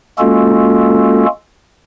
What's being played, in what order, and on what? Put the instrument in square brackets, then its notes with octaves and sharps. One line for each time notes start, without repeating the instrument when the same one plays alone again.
[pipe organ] G#3 A#3 C#4 F4 F#4 A4